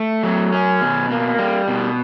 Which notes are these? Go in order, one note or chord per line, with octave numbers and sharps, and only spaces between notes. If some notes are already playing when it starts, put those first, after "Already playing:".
Already playing: A3
F#3
C#4
B2
A#3
G3
B2